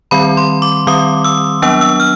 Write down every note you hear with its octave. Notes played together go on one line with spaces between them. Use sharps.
D#3 G3 C4 B5
C6
D6
D#3 G3 C4 D#6
E6
F#3 B3 D4 E6
E6
F6